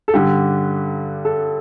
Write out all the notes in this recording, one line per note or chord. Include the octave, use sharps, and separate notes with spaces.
A4
G2 D3 G4
A4